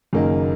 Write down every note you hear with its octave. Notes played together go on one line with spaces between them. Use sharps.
F#1 F#2 D#3 A#3 D#4